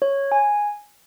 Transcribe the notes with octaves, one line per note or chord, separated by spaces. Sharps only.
C#5
G#5